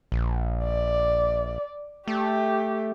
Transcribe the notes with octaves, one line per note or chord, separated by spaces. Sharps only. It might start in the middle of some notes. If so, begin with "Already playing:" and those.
A#1
D5
A3 G4